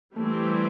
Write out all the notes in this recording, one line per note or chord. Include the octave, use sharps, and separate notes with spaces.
E3 G3 A3 C4